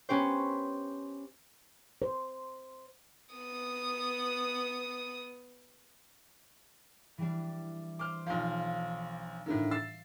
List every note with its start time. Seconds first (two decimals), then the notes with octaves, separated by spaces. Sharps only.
0.09 B3 C#4 G4 C5
2.02 C5
3.35 B3 D#6
7.18 E3 G3 D4
7.99 C5 D6 F6
8.26 B1 F3 F5 C6 F6
9.46 A2 D3 D#3
9.71 E6 A6 C7